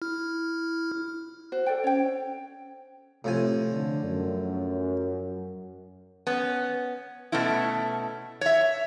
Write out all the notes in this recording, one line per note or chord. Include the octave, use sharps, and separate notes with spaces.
E4 F6
F#4 C5
A4 D5 G5
C#4 C#5 G5
A2 C3 F3 G#5
D3
F#2
B3 C#4
B2 A3 B3 C#4 E4
C#5 E5